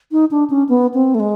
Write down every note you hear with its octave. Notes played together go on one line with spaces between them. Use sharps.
D#4
D4
C#4
B3
C4
A3
G#3